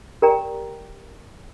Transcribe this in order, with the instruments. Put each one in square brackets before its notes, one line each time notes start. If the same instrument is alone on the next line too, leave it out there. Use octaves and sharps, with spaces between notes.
[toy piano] G4 A#4 D5 G5 A#5